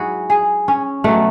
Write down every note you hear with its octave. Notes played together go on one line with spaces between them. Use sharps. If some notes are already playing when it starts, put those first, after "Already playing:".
Already playing: G#2 F#3 E4 F#4 G#4
G#4
C#4
B2 F#3 A3